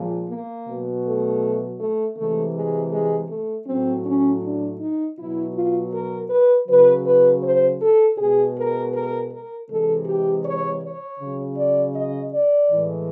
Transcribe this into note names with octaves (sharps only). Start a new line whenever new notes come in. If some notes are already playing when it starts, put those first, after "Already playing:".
Already playing: A#2 F3 G#3
A#3
B2 F#3
A3
A3
C3 E3 G#3 A3
G#3
G#3
A3
A2 F#3 C4
C#4
D4
D#4
B2 F#3 E4
F4
A#4
B4
C#3 F#3 B4
B4
C5
A4
B2 G#3 G#4
A#4
A#4
A#4
C3 E3 G#3 A4
G4
C#5
C#5
C#3 F#3
D5
D#5
D5
A2 E3 G#3